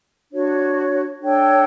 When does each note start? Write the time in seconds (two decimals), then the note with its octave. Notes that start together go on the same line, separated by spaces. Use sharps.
0.32 D4 F#4 C#5
1.21 D4 A4 C#5 G5